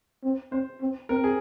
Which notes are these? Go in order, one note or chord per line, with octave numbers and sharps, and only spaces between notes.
C4
C4 C5
C4
C4 A#4
G#4